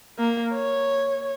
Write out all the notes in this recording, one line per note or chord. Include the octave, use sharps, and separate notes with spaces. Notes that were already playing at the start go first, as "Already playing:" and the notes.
A#3
C#5